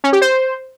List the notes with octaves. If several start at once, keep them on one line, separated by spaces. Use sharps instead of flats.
C#4
G4
C5